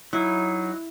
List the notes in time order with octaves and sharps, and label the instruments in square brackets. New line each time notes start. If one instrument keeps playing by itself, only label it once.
[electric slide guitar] F#3 D#4 [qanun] E4